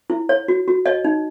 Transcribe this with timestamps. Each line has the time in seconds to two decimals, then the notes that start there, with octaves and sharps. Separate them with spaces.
0.10 E4
0.29 C#5
0.48 F#4
0.68 F#4
0.86 C#5 D#5
1.05 D#4